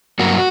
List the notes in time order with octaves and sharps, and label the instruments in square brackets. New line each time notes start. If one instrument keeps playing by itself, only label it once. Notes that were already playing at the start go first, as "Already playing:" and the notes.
[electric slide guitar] G2 F#3 A#3 F#4